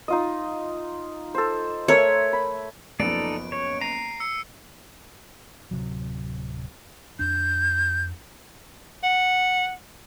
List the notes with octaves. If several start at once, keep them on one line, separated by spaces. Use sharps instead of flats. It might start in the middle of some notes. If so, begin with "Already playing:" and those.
D#4 F4 D#5
A4 C5
A3 A#4 C#5 E5
B5
F#1 F3 B3 D#4 A4 D5 D7
C#5
A#5 C7 D#7
E6 C#7
D1 C3 F#3
F2 D4 G6
F#5